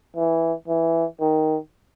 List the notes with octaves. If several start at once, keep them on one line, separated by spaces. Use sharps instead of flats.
E3
E3
D#3